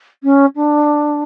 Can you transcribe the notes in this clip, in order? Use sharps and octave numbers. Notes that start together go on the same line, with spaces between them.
C#4
D4